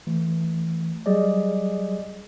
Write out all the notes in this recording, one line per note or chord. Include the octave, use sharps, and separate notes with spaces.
E3 A3
F#3 G3 G#4 D5 D#5